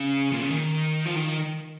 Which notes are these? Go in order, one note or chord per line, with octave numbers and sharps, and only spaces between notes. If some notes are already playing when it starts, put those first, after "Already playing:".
Already playing: C#3
A#2
C#3
D#3
F3
D#3